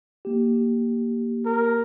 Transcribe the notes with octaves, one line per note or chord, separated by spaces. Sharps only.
A#3 G4
A#4